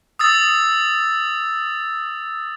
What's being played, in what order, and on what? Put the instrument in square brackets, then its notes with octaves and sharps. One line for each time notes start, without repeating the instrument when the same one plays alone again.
[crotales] D#6 E6 A6